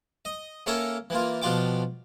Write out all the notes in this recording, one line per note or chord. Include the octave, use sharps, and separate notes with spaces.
D#5
A#3 C#4 A4 A#4 C#5 E5
E3 A#3 F4
B2 F3 D4 F4 G5 D6